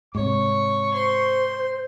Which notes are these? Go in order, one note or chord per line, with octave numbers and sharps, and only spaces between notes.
G#2 C3 C#5 C#6
C5 C6